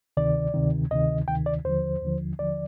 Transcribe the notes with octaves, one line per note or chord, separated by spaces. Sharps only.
D2 C3 D#3 D5
D2 C3 D#3
D2 C3 D#3 D#5
D2 C3 D#3 G5
D5
D#2 D3 F3 C5
D#2 D3 F3
D#2 D3 F3 D5